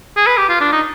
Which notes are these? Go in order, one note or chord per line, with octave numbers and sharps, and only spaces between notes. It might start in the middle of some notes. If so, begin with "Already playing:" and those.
G#4
B4
G4
F4
D4
D#4